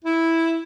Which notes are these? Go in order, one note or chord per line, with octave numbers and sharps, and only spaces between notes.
E4